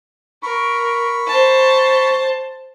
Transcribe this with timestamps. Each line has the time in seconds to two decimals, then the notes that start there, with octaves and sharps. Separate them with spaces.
0.43 A#4 B5 C#6
1.27 C5 A5